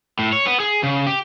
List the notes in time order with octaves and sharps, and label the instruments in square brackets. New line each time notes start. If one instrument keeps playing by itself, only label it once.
[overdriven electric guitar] A2
C#5
B3
G#4
C#3
G4